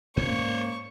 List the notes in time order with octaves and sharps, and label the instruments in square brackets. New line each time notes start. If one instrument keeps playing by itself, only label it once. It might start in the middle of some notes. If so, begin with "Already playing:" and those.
[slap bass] G#2 C#4 [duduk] A#3 [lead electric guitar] C5 C#5 [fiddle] C#6